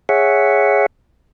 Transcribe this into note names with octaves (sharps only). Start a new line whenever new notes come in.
G#4 C#5 E5 F#5